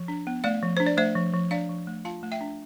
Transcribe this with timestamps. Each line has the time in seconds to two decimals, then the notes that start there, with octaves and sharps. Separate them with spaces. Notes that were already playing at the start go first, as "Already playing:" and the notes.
Already playing: F3
0.08 D4
0.27 B3
0.44 A3 D5 F5
0.63 F3
0.77 D4 C5
0.86 D5
0.97 A3 C5 E5
1.15 F3
1.33 F3
1.51 D4 D5 F5
1.69 F3
1.87 A3
2.05 F4 F5 A5
2.23 A3
2.32 E5 G5
2.41 D4